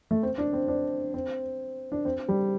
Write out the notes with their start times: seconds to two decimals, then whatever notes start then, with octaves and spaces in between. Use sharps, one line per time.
0.11 A3
0.23 C4
0.38 D4
0.53 C4
0.68 D4
1.14 C4
1.92 D4
2.05 C4
2.29 G3